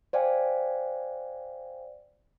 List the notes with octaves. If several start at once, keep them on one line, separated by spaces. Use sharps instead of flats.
C5 D5 F5 G5 G#5